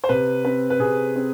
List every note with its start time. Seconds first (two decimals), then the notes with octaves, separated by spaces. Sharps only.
0.04 C5
0.09 C3 B4
0.45 C4 B4
0.70 B4
0.80 C3 G#4
1.16 C4